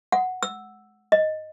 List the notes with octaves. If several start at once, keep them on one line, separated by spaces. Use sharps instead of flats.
F#5
E6
D#5